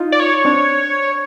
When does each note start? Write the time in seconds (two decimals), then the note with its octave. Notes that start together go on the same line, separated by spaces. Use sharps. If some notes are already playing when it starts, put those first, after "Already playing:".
Already playing: D#4 F4
0.12 D5
0.20 C#5
0.45 C4 D4